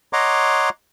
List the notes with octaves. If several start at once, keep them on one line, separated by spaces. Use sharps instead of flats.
C#5 D#5 F#5 A#5 C6 D6